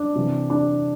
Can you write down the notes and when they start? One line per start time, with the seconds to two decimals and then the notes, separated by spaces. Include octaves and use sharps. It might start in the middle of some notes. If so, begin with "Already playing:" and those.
Already playing: D4
0.15 C3 E3
0.50 D4